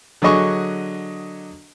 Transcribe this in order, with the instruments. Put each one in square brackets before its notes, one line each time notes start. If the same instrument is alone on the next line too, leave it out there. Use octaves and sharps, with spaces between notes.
[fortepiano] D3 F#3 G#4 D#5 C#6